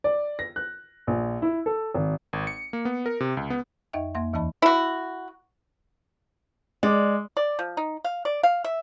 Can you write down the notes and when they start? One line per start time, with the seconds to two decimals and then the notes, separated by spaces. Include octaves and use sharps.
0.04 D5
0.39 A#6
0.56 F#6
1.07 A#1
1.42 E4
1.66 A4
1.94 G#1
2.33 G#1
2.47 C#7
2.73 A#3
2.85 B3
3.06 A#4
3.20 C3
3.37 C#2
3.50 B3
3.93 F2 D#4 D#5 E5 G5
4.15 F2 A#3 E5 C6
4.33 D#2 E3 D#4 D#5 A5 B5
4.62 E4 F#4
6.83 G#3 D5
7.37 D5
7.59 F3
7.77 D#4
8.04 F5
8.25 D5
8.43 F5
8.64 E5